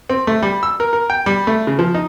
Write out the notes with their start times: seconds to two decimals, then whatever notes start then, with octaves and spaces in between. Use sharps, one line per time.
0.10 C4
0.27 A3
0.42 G3
0.63 E6
0.80 A#4
0.93 A#4
1.10 G5
1.26 G3
1.47 A3
1.67 C#3
1.79 F3
1.94 D#4